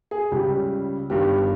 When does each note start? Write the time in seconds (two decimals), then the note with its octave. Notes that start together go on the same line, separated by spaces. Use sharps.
0.11 G#4
0.32 C#2 C#3 G3 G4
1.10 G1 G2 D#3 G3 G4